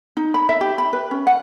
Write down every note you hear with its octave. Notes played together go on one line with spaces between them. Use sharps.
D#4
B5
E5
G4
B5
B4
C#4
F#5